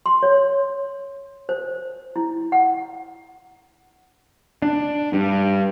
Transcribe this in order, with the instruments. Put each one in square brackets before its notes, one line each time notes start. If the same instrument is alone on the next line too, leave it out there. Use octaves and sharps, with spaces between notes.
[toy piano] C6
C#5
C5
E4
F#5
[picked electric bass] D4
G2